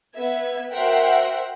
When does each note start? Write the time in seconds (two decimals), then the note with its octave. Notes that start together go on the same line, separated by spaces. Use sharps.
0.16 B3 E5 G#6
0.71 F#4 A#4 C5 E5 F#5 G5